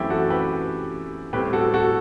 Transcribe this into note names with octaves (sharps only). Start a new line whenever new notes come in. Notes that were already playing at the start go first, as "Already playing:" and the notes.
Already playing: F#2 E3 A3 C4 E4 G4
F#4 A4
G4 B4
A2 G3 C4 G4 B4
F#4 A4
F#4 A4